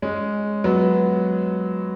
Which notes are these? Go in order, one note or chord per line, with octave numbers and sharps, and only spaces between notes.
G#3 C#4
F#3 B3